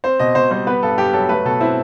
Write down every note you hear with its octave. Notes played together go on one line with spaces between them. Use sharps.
C4 C5
B2 D#5
B2 C5
G3 C5
B3 B4
G2 A4
G2 G4
F#3 A4
A3 B4
B2 A4
C4 E4